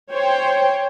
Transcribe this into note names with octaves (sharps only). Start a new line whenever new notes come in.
C5 C#5 G5